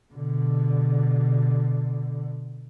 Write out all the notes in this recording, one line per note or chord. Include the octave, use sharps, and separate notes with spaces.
B2 D3